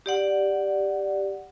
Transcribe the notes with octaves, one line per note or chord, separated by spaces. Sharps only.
G4 D5 F#5